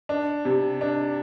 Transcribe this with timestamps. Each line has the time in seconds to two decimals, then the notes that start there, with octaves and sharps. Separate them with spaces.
0.09 D4
0.45 C3
0.81 D4